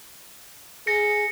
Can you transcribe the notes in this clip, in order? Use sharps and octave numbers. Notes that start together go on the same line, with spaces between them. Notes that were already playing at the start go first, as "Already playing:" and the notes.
G#4 A#6 C#7